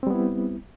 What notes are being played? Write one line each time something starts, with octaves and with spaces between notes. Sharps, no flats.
G3 B3 C4 E4